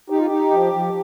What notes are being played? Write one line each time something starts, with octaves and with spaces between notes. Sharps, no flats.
D#4 G4
F4
D#4 G4
F3
F3